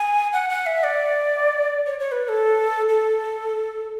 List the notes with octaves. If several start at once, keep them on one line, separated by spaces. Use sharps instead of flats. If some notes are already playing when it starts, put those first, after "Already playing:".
Already playing: G#5
F#5
F#5
E5
D5
C#5
C#5
B4
B4
A4
A4